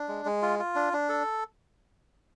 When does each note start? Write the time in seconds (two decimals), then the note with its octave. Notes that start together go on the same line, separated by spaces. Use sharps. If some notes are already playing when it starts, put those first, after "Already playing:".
Already playing: D4
0.08 G#3
0.25 G#3
0.42 F4
0.59 F4
0.75 D4
0.93 D4
1.09 A4